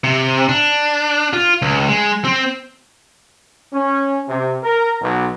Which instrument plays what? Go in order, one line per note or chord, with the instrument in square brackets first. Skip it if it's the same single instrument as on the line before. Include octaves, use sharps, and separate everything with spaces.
[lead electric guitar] C3
D4
F4
C#2
G#3
C4
[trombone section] C#4
C3
A#4
B1